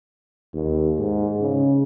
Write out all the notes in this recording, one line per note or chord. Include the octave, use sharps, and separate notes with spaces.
D#2
G#2
C#3